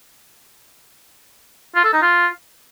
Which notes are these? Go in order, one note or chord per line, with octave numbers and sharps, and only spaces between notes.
F4
A4
D#4
F4